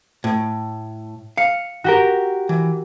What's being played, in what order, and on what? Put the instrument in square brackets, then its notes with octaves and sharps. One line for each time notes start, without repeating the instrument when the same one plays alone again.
[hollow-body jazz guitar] A2
[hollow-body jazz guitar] F5 [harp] C#7
[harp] F#4 G4 A#4
[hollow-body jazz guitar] E3